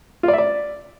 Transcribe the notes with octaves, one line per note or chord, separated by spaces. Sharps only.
F4
D5
E5
D5